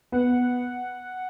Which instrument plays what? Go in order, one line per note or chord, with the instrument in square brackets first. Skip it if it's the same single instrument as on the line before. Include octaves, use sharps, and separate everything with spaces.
[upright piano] B3 [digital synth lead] F#5